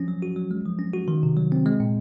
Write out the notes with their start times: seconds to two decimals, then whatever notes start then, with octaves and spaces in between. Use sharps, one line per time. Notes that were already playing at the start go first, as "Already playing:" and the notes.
Already playing: F3 C#4
0.08 F#3
0.22 F#4
0.36 F#3
0.51 G#3
0.65 F3
0.79 C#4
0.94 F#4
1.08 D#3
1.23 C3
1.37 F#3
1.52 C4
1.66 G#3
1.80 A#2